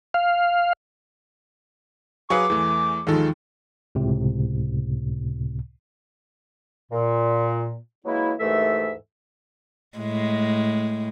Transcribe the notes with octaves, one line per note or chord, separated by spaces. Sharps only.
F5
F#3 G#4 B4 F5 D6 C#7
E2 E3 A3
D#2 D#3 F3 G#3 A4
C#2 A2 C3
A#2
E3 F#3 G#3 A#3 E4
D#2 G#2 E3 A3 A4 E5
A2 G#3